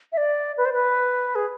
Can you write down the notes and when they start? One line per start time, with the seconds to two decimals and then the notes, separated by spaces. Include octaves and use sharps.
0.12 E5
0.17 D5
0.57 B4
0.65 C5
0.73 B4
1.35 G#4